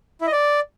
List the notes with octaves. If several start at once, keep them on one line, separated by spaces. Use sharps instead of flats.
E4
D#5
D5